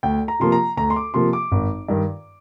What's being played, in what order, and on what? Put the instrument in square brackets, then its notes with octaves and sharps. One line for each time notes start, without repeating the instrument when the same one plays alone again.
[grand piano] D2 G5
A#5
C3 F3 A#3 C6
A#5
D2 A#5
C6
D6
C3 F3 A#3 C6
D6
G#1
G2 D#3